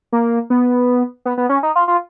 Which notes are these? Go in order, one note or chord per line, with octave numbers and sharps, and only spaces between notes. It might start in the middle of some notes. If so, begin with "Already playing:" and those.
A#3
B3
B3
B3
C#4
D#4
F4
F4